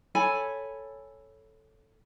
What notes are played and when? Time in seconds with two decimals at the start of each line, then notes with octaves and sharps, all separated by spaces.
0.15 A4 C#5 G#5 B5